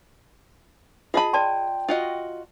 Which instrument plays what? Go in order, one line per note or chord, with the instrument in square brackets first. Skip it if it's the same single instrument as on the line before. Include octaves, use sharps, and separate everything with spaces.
[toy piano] F4 D#5 A5 [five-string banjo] G#4 B5
[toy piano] D5 A5 C6 [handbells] G5
[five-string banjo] F4 F#4 D#5